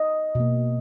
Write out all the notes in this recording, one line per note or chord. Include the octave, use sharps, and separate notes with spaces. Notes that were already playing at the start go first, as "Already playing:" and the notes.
Already playing: D#5
B2 A#3